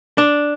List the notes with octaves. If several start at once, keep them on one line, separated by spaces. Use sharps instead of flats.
D4